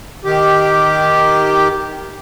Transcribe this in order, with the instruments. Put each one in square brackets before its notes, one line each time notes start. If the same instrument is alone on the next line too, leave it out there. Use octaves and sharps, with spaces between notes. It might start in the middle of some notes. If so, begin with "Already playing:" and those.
[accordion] D#3 G4